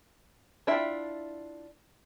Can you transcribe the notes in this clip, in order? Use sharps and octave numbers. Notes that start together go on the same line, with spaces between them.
D4 E4 F4 E5 G5